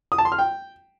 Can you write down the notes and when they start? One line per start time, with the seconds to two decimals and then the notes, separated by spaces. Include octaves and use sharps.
0.12 D#6
0.18 A5
0.25 C6
0.32 F6
0.38 G5